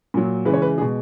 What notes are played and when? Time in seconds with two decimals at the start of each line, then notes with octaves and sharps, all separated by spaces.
0.14 A#2 F#3
0.45 C#3 E3 G#3 B4
0.53 C#5
0.62 B4
0.78 B2 G#3 G#4